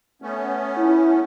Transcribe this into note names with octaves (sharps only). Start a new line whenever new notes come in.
A3 B3 C#4
E4